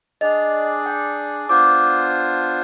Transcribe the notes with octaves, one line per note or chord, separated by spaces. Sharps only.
D4 G#4 D5 D#5
G5
B3 D4 F4 C5 D6